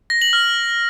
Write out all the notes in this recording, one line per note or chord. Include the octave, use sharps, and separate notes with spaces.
A#6
F#7
F6